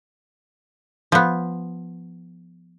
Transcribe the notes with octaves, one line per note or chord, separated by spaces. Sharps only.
F3 B3